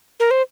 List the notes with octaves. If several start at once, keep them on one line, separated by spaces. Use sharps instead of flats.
A#4
C5